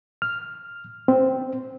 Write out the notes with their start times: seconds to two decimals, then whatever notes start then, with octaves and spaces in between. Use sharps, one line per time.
0.22 F6
1.08 C4